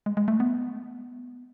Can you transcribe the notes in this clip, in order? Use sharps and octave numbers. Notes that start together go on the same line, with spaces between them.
G#3
G#3
A3
B3